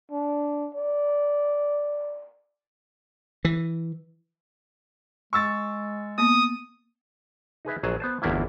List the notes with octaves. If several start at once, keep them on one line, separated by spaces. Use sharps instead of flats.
D4
D5
E3
G#3 C#6 E6 A6
A#3 B3 D#6
D#4 G#4 B4 E5
A#1 F#3 G#4 A5
B3 C5 A5
G1 E2 A3 A#3 E4